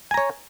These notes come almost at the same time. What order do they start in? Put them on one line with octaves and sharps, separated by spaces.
G#5 A#5 C#5